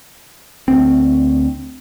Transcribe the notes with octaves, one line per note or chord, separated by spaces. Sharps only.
D2 C4